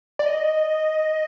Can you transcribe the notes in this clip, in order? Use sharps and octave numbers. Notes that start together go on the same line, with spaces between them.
D5
D#5